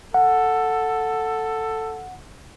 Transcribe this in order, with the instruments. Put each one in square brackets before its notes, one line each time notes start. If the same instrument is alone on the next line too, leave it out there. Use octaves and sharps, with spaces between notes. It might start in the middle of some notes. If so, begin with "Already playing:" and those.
[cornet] A4 [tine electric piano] F#5